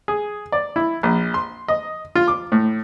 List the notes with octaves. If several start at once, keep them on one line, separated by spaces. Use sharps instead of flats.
G#4
D5
E4
A#1
C6
D#5
F4
D6
A2